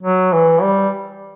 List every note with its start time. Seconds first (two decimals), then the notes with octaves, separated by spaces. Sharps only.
0.03 F#3
0.33 E3
0.62 G3